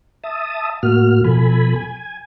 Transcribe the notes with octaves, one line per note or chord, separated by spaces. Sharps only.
E5 A5 D#6
A2 A#3 F#4 F6
B2 F3 A4 G#5 B5
G#5